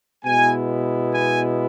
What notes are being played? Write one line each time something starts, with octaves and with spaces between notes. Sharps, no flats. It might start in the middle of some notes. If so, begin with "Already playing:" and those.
B2 G#3 B3 E4 G#5
G#5